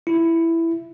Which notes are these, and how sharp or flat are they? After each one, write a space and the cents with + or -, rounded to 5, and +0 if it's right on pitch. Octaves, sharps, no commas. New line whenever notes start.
E4 +5